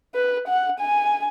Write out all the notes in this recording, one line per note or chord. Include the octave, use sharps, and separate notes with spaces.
B4
F#5
G#5